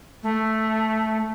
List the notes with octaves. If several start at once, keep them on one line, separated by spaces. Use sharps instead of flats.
A3